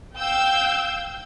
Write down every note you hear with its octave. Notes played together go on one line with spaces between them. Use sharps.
F5 G5 E6 G6